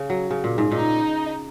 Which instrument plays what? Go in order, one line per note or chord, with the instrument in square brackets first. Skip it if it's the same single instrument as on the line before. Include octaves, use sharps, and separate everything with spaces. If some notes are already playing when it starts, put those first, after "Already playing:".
Already playing: [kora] C#3
F#3
C#3
A#2
G#2
[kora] A#2 [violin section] D#4